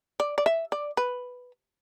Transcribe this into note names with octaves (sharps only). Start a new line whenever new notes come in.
D5
D5
E5
D5
B4